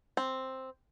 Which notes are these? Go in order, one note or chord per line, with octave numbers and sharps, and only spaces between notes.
C4